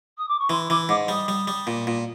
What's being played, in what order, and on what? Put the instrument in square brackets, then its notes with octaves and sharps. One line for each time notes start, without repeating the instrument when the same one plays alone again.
[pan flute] D#6
D6
C#6
[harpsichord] E3 [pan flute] C6
[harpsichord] E3 [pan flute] D6
[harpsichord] G#2 [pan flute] D6
[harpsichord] G3 [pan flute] D#6
[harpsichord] G3
G3
A#2
A#2